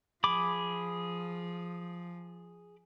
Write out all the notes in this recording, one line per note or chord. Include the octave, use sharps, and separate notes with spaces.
F3 G#4 B5 D6